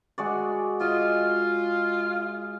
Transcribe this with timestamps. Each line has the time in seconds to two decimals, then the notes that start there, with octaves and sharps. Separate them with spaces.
0.18 G#3 F#4 D5
0.81 F4 D#5 F6